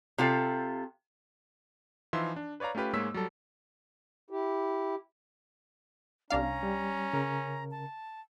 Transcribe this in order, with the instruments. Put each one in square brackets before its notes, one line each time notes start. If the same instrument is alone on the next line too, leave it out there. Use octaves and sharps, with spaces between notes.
[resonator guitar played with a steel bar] C3 F4 A4
[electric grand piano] E3 F3 D#4 E5 F5 C6
D4
B4 C#5 D5 F5 A#5
A3 C#4 F4 G4 B4
G#2 G#3 A#3 C#5 E6 B6
F#3 G3 A4
[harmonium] E4 G4
[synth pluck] C2 D4 F5 [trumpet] C#4 [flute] A#5
[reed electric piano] G3
C#3 A#4
[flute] A5